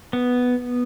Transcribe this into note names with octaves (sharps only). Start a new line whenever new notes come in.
B3